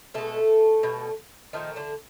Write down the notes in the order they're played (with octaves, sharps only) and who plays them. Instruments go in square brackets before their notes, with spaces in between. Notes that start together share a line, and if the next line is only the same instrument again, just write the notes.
[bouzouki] B2 G#3 A3 A4
B2 G3
A#2 D#3 F3 A3 D#4
D3 D4